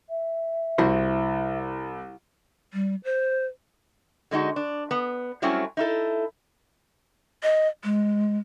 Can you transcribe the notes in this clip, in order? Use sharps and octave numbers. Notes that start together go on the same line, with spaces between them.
E5
C2 E4 F#4 C5
G3
C5
D3 G#3 D#4 F#4
D4
B3
F#3 G3 A3 C4 C#4 E4
D#4 E4 A4
D#5
G#3